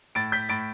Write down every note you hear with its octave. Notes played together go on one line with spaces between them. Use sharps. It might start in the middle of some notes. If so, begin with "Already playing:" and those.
A2 A6 D7
G6 B6
A2 A6 D7